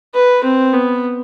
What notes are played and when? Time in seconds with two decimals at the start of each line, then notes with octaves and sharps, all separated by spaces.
0.14 B4
0.44 C4
0.73 B3